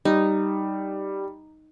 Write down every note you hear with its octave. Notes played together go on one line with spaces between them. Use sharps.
G3 D#4